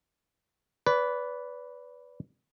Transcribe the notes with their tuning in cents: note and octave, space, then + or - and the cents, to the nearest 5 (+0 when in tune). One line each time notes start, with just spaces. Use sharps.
B4 +0 D5 -30